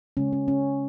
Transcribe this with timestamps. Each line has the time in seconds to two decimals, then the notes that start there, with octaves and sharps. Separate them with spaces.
0.17 C#3 G#3 C#4
0.33 C#4
0.48 C#4